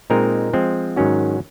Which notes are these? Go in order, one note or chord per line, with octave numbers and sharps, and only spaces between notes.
A#2 G#3 C4 D#4 A#4
F3 G#3 C4
G#2 D#3 F#3 C#4 F#4